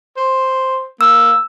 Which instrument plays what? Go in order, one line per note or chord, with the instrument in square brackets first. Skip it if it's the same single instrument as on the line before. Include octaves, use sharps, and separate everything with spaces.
[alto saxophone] C5
[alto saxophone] A#3 [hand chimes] E6